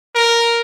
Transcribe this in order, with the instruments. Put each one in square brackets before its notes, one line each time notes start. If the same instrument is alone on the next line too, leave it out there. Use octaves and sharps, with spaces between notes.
[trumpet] A#4